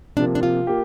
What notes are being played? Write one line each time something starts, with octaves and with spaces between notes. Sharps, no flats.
C3 F3 A#3 D4
D4
F4
A#3 G4